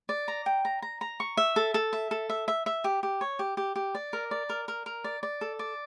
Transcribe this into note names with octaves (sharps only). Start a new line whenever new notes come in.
D5
A#5
G5
A#5
A#5
A#5
C#6
E5
A4
A4
E5
A4
E5
E5
E5
G4
G4
C#5
G4
G4
G4
D5
A#4
D5
A#4
A#4
A#4
D5
D5
A4
D5